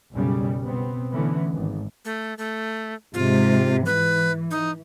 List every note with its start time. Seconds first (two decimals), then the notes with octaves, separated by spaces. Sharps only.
0.12 B1 F#2 C#3 G3
0.63 B2 B3 C4
1.11 D3 E3 A3 B3 C#4
1.53 G#1
2.05 A3
2.38 A3
3.14 G#2 C3 F4
3.86 E3 B4
4.51 D#4